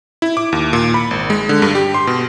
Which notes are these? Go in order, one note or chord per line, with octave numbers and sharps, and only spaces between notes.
E4
D6
D#2
A#2
B5
G#1
G#3
D3
G2
G4
C6
B2